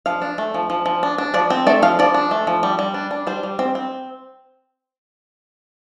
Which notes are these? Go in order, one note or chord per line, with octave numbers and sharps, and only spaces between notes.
F3 F5
D4
A3
F3
F3
F3
D4
D4
F3 D5
C4
A3 D5
F3 F5
F3 D5
D4
A3
F3
G3
G3
D4
D4
G3 C5
G3
C4
C4